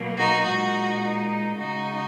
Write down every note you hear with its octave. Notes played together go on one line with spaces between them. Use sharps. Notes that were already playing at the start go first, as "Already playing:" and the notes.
Already playing: B2 F#3 A#3
D#4 F#4
A#2 G#3 D#4 F#4
D#4
C#3 G#3 D#4 F#4